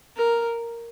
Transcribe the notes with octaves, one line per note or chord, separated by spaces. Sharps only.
A#4